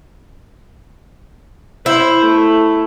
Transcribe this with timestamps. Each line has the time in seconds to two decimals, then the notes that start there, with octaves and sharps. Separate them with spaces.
1.86 E4 C5
2.24 A3